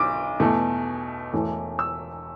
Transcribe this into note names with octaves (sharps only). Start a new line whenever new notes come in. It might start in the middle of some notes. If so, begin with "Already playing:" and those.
Already playing: B1 D6
E2 B2 A3
E1 E2 E3 A3
E6